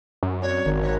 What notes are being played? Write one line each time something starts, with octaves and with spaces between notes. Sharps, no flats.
F#2
C4 F#4 C#5 D5
G#1 D#3 A#4 D7
C#5 F#6 A#6 B6